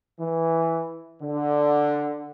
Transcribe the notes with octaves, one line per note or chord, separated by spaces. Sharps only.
E3
D3